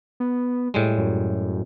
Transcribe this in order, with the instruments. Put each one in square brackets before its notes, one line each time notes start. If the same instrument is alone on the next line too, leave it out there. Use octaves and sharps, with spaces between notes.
[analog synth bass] B3
[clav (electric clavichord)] A2 G3 G#3
[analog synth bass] F#2